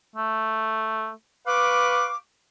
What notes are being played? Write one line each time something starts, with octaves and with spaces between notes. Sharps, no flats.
A3
B4 F5 C#6 D6